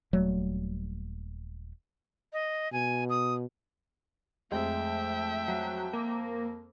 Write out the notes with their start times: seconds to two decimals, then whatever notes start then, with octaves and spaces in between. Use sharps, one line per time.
0.13 D#1 F#3 G3 A3
2.33 D#5
2.73 B2 G#5
3.10 D#6
4.52 F2 G#3 A3 E5 G5
5.48 F#3
5.93 A#3